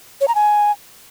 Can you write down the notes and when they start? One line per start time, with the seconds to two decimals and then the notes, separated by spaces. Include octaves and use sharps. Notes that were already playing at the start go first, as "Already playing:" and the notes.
0.21 C#5
0.28 A#5
0.35 G#5